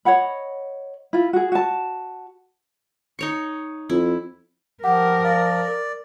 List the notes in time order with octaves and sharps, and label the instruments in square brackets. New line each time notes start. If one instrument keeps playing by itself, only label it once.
[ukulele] C#5 D#5 F#5 B5
E4 F4
F#4 G#4
F#4 A5
[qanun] D#4 C#5 C#6
[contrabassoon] F2 [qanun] E4
[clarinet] F3 [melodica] G4 [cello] A#4 [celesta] F#5
[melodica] D5 [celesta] F5
[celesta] A#4